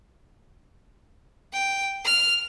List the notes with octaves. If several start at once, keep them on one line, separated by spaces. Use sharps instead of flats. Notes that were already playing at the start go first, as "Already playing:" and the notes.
G5
F6